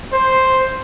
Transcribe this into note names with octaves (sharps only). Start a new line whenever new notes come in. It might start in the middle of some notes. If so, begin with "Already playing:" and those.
C5